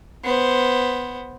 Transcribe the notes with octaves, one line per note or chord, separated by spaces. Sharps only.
B3 C5